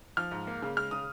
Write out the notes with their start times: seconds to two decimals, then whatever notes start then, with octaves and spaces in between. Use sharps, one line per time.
0.17 F3 F6
0.31 G#2
0.47 A#3
0.62 C#3
0.77 G#3 F6
0.91 C#3 D#6